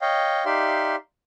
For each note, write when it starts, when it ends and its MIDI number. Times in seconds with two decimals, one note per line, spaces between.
0.02 0.44 73
0.02 0.44 75
0.02 0.44 77
0.02 0.44 79
0.46 0.96 63
0.46 0.96 67
0.46 0.96 74
0.46 0.96 76
0.46 0.96 77
0.46 0.96 84